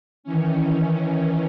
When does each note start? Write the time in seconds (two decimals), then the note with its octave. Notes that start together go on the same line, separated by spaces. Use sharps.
0.24 D#3 E3 C#4